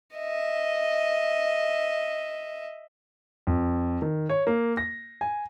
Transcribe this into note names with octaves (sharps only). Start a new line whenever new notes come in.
D#5 E5
F2
D#3
C#5
A#3
A#6
G#5